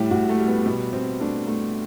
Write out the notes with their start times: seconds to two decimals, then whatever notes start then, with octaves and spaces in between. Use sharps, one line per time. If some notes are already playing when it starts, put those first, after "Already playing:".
Already playing: A2 G3 E4 G4
0.11 A2 F#4
0.29 A3
0.38 G3
0.48 B3
0.66 B2 B3
0.93 B2 C4
1.20 A3 D4
1.47 A3